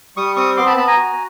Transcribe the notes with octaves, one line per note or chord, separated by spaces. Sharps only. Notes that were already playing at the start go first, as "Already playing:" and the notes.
G3 C#6 D#6
C4 C#6 D#6
B3 C6 D6
A5 B5
B3 A5 B5
G#5 A#5
F#4